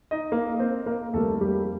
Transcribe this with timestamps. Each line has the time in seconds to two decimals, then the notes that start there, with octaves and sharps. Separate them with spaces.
0.11 D#4 D#5
0.32 A#3 A#4
0.59 C4 C5
0.86 A#3 A#4
1.13 F2 D#3 G3 A3 A#3 A4
1.41 G3 G4